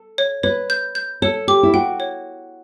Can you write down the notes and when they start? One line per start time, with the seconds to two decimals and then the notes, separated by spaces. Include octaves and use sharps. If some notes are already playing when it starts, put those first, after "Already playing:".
Already playing: A4
0.18 C#5
0.43 B4 C#5
0.70 G6
0.95 G6
1.22 A4 C#5
1.48 G4 D6
1.63 E4
1.74 F#4 G5
2.00 C#5